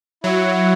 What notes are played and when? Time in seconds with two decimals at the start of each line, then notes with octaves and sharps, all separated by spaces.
0.24 F#3 E4 C#5 F#5